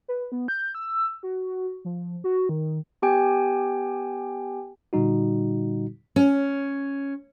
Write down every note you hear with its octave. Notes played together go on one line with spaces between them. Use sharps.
B4
B3
G6
E6
F#4
F3
F#4
D#3
B3 G4 G5 G#5
A#2 D3 G3 D#4 F#4
C#4